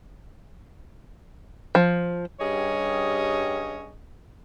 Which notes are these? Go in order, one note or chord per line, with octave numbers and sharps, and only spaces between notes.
F3
G2 G3 C#4 G#4 C#5 D#5